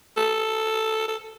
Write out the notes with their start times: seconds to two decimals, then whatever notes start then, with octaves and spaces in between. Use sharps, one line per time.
0.17 A4
1.08 A4